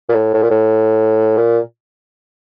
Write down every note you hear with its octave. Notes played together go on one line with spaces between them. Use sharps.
A#2
A2
A2
A#2
A2
A#2